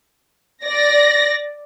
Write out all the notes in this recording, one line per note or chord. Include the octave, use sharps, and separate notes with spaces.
D5 A#6